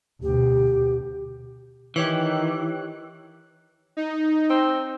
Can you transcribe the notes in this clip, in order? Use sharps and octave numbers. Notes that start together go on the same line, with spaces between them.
D2 B2 G4
D#3 E3 G4 C#5 F#6
D#4
C4